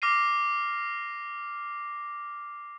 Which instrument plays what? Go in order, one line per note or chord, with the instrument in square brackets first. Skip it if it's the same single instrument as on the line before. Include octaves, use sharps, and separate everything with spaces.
[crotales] D6 F6 A#6 C7 D#7